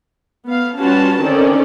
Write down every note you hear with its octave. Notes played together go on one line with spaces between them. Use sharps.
B3 F5
G3 C#4 F4 F#4 B4 A5
D3 D#3 C4 C#4 D5